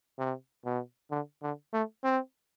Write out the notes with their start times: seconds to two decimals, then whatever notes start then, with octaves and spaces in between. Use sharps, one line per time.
0.19 C3
0.65 B2
1.11 D3
1.42 D3
1.73 A3
2.04 C4